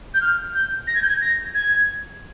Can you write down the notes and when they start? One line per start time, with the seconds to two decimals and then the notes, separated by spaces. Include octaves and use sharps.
0.14 G6
0.21 F6
0.54 G6
0.87 A#6
0.95 G#6
1.02 G6
1.09 G#6
1.21 A#6
1.55 G#6